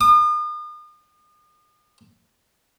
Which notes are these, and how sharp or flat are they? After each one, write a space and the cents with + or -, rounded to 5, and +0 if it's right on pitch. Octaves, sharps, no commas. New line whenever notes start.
D#6 -40